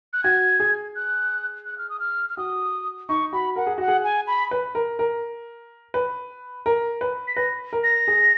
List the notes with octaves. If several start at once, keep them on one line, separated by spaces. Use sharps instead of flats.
F#6
F#4 G#6
G#4
F#6
F#6
F6
D#6
F6
F6
F#4 D#6
D#4 C#6
F#4 B5
A#4 F#5
G#4
F#4 F#5
G#4
G#5
B5
B4
A#4
A#4
B4
A#4
B4
B6
B4 A#6
A#4
A#6
G#4